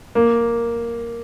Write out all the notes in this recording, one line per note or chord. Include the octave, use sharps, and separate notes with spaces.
A#3